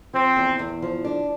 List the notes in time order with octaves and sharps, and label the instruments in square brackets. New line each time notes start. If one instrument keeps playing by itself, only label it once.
[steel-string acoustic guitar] F3 [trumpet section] C4
[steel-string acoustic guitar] E2
E2
F3
D4